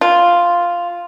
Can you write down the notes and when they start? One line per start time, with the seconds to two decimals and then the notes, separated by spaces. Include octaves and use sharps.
0.01 F4